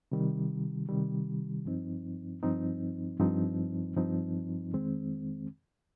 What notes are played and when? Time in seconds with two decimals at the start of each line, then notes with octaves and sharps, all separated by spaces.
0.12 C3 D#3 G3
0.89 C3 D#3 G3
1.65 G2 F3 C4 D#4
2.43 G2 F3 C4 D#4
3.20 G2 F3 C4 D#4
3.96 G2 F3 C4 D#4
4.73 F2 D#3 G#3 C4